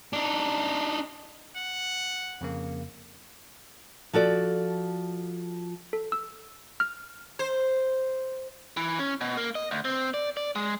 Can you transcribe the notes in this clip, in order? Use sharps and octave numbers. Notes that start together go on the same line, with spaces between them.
D4 D#4
F#5
F2 C#3 A#3
F3 F#4 A4 D5
A4
E6
F6
C5
E3
C#4
B2
A#3
D#5
D2
C4
D5
D5
G#3